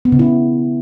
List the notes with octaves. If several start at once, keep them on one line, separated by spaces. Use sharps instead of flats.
B3
C#3
E4